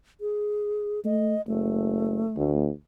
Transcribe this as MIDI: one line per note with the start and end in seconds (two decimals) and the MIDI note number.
0.21 1.00 68
1.05 1.35 57
1.05 1.42 75
1.48 2.21 30
1.48 2.52 57
2.37 2.69 38